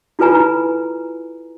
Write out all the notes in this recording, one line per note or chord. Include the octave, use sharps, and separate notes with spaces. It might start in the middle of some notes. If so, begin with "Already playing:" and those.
E4 F4 A4 B4 G#5 A#5